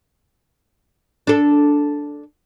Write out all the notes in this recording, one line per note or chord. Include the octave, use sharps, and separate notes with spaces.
D4 A4